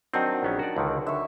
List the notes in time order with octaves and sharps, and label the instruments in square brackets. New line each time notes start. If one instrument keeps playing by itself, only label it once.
[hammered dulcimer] D#3 F#3 D4 [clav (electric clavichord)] C4 D#4
[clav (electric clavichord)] A#1 B3 C#4
F#4 D5
C#2 D3 D#3
[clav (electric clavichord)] D3 [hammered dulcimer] E5 C#6